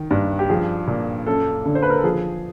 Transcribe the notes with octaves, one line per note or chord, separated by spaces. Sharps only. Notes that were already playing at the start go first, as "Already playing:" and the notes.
Already playing: D#3
G2
G4
F3 G#4
A#2
F#2 A4
D3
C5
B4
A#4
A4
F3 G#4